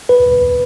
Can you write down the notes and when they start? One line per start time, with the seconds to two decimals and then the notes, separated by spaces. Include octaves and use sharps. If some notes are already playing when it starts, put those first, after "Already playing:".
0.09 B4